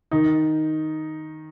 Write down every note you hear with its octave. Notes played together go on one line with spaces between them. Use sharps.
D#3 D#4